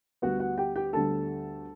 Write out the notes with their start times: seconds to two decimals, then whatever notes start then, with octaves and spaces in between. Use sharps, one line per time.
0.22 D2 D3 G3 B3 F#4 F#5
0.40 F#4 F#5
0.58 G4 G5
0.76 G4 G5
0.93 D2 D3 G3 B3 A4 A5